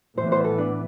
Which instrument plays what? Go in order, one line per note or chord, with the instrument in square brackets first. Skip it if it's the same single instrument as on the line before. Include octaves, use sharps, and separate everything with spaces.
[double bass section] A2 E3 B3 [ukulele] C5
[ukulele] C5
A4
D4